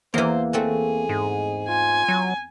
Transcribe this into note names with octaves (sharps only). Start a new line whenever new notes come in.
E2 E3 A#3 C5
A3 C4 F#4 G#4
G#2
F4 G#5
F#3